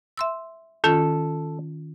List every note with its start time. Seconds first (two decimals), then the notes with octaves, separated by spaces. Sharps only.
0.17 E5 C6 E6
0.84 D#3 C#4 F4 A4